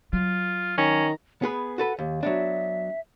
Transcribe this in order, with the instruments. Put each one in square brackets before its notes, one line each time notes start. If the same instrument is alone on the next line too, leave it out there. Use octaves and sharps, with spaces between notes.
[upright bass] F#3 [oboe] F4
[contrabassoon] D#3 [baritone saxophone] C#4 [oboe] A#5
[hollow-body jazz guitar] B3 G#4 B4 [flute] B5
[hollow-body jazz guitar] F#4 A4 B4 [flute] F#5
[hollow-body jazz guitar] D#2 [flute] G4
[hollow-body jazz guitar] F#3 B3 D4 [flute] E5